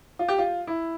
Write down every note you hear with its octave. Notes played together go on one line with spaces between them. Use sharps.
F4
G4
F4
E4